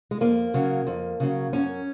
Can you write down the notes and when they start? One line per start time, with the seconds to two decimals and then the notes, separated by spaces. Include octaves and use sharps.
0.11 G#3
0.21 F2 A#3
0.54 C#3 F#3
0.87 F2
1.20 C#3 F#3
1.53 F#2 C#4